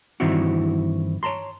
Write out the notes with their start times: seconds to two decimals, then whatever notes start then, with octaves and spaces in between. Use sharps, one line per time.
0.20 G2 D#3 E3 C4 E4 F#4
1.23 C#5 A5 A#5 C6